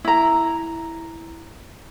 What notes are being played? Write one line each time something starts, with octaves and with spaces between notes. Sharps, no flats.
E4 A#5